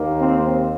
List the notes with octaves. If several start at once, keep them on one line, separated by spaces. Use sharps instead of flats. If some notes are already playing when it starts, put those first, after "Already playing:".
Already playing: D#2 D#3 A#3
C4